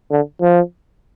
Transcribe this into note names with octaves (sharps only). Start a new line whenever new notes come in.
D3
F3